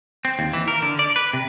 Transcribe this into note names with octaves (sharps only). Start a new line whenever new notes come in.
C4
D#2
E3
A#4
D3
D5
B4
C3